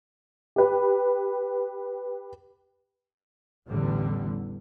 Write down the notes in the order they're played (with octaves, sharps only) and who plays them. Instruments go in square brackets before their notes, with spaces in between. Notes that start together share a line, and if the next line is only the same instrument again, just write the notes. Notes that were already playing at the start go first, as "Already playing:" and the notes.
[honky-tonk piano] G4 B4
[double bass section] A1 E2 D3 G3